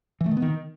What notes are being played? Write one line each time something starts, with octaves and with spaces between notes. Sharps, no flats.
E3
A3
D#3
B3
D#3